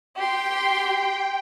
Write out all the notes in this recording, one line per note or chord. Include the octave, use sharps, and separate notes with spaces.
G4 G5 C6